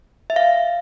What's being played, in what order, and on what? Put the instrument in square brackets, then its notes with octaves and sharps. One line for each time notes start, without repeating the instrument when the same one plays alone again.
[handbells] E5
F5